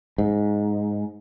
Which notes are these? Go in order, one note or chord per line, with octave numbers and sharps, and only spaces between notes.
G#2